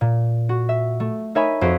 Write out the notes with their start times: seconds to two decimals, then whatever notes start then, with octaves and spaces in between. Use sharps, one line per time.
0.01 A#2
0.49 F#4
0.69 E5
1.00 A3
1.35 D#4 A#4 C#5 E5 G#5 B5
1.61 F2 F#4 C5 B6 D7